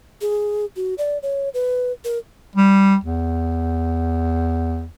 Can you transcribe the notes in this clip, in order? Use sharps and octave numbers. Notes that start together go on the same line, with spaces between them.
G#4
F#4
D5
C#5
B4
A#4
G3
E2